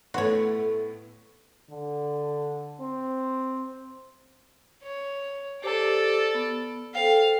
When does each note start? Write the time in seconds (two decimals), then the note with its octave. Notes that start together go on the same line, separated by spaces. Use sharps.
0.14 A2 A3 B3 F#4 C#5
1.70 D3
2.80 C4
4.83 C#5
5.63 G4 A4 C5 D5 D6
6.34 B3
6.95 A4 C5 F5 G5